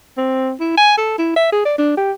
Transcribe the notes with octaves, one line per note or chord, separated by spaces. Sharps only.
C4
E4
G#5
A4
E4
E5
G#4
D5
D4
G4